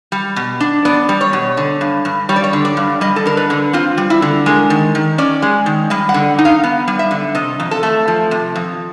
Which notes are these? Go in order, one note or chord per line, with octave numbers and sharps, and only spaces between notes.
G3
B2
D4
B3 D5
G3
C#5
B2
D3
G2
G2
G3 C#5
D5
C#5
D3
D5
G2
G3 D#5
A4
D3 A#4
B4
D3
C4 F4
G3
E4
D3
G#3 A#4
D#3
D#3
C#4 D5
G#3
D#3
G3 D#5
F#5
D3
D#4
F5
B3
G3
E5
D3
C3 D#5
F2
A4
A3
F3
C3
F2